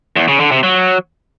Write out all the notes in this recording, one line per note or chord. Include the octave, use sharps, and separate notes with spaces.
E2
C#3
D3
C3
F#3